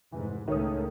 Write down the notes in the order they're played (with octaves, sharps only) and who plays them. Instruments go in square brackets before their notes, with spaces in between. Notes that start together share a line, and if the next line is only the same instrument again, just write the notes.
[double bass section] F1 G#2 [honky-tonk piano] E3
[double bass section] C#2 A2 A3 [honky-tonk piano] D#3 C#5 D#6